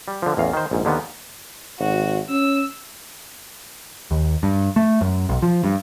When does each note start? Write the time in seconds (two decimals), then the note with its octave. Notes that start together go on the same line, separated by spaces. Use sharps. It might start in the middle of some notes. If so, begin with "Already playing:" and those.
0.08 G3
0.22 D3 F3
0.37 A1 E2 F5
0.53 D#3 C5
0.71 A#1 G#2
0.85 D#2 D3 D#3 B3
1.79 G#1 F#4
2.29 C#4 E6
4.11 D#2
4.43 G2
4.76 A3
5.01 F#2
5.29 B1
5.42 F3
5.64 G2